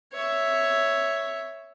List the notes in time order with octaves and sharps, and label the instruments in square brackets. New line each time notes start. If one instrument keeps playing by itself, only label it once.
[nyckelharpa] C#5 E5